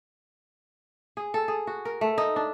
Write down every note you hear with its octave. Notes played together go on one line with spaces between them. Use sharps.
G#4
A4
G#4
F#4
A#4
A3
D#4
D4